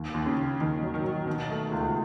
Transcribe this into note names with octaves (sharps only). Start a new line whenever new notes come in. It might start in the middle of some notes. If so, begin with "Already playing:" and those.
Already playing: D#2
D#2
C#3
D#2
D#2 D#3
F#3
D#3
F#3
B2 D#3
A3
C#2